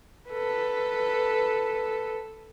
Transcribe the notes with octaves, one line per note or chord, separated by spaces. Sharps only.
A4 B4